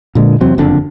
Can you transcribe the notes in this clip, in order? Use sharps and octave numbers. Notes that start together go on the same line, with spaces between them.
A#2 D3 G#3
E2 C3 F#3 C4
F#1 F2 D3 D4